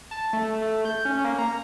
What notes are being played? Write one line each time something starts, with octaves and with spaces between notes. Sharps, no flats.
A5
A3
A3
G6
C#4
A#3
A#5